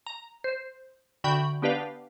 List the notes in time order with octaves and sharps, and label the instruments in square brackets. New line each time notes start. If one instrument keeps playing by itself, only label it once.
[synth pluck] A#5
C5
D3 F#4 E5 G5 B5 G6
B3 D4 G4 B4 D5 F5